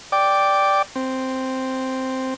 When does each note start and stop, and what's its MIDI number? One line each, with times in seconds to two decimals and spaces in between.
0.12 0.82 74
0.12 0.82 79
0.12 0.82 86
0.96 2.34 60